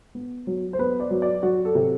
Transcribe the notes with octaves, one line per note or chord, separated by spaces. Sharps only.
B3
F#3
C5
B3 B4
D5
F#3
D5
F#3 F#4
A4
C3